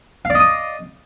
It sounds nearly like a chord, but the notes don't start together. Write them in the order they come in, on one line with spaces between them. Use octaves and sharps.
F5 D5 D#5 D#6